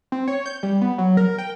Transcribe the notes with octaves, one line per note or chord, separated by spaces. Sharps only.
C4
C#5
G6
G3
B3
F#3
A#4
G5